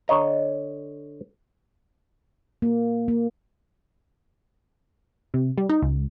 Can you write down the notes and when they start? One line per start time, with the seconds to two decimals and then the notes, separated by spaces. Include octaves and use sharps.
0.08 D3 C#5 D#5 A#5
2.62 A#3
3.08 A#3
5.34 C3
5.58 G3
5.69 D#4
5.82 C#2